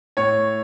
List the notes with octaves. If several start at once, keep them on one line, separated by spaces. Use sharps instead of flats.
A2 C#5